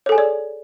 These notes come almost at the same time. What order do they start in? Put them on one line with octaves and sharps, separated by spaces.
C#5 A4 G#5 G#4 D5